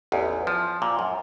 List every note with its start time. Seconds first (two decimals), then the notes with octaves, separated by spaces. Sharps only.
0.12 A1 E2
0.47 F3
0.82 A#2
0.99 F#2